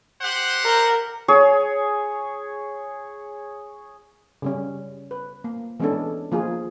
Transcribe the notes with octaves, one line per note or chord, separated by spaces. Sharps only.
G4 C5 F#5
A#4
G#4 C#5
C#3 G3 C#4
B4
A#3
E3 G#3 B3 C#4 D4 A4
F3 A#3 F4 G#4